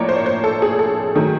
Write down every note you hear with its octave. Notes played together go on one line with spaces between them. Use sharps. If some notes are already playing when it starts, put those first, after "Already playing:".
Already playing: A2 F3 A#3 C#5 D5
C5
C#5
C5
A4
G#4
A4
D#3 F#3 A3 G#4